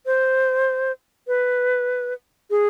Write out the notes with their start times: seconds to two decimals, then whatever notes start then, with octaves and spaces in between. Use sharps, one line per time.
0.06 C5
1.28 B4
2.50 G#4